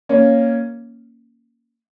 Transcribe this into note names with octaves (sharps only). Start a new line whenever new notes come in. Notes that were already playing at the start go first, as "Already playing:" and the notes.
A#3 C#4